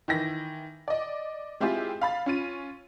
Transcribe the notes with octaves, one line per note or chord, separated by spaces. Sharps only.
D#3 E3 A#6
D5 D#5
G#3 C4 E4 F4 G4 G#4
F5 B5 A6
C#4 F4 D#7